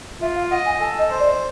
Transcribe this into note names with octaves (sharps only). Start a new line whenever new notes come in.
F4 E5
F5
D#5 F#5
G#5
A4 G#5
D#5
C5
D5